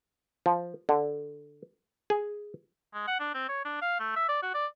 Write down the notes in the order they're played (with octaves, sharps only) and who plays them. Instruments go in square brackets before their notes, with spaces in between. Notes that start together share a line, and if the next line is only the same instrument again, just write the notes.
[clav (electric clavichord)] F3
D3
G#4
[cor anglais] G#3
F#5
D4
C4
C#5
D4
F5
A3
E5
D5
F#4
D5